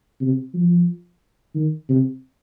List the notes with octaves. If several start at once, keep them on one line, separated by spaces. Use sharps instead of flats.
C3
F3
D#3
C3